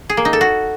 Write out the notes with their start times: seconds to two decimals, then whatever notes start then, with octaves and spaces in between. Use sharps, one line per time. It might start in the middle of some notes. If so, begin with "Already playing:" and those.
0.10 G#4
0.17 A#3
0.25 D#4
0.33 A4
0.41 F#4